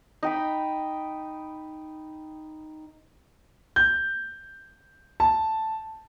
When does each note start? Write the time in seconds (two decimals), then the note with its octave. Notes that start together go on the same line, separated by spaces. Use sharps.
0.23 D#4 G5 B5
3.76 G6
5.20 A5